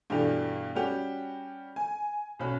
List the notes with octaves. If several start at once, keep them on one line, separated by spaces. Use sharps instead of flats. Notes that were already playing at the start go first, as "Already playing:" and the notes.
G2 B2 E3 A3 D4 G4
G3 C#4 F#4 G4
G#5
B1 B2 C#4 B5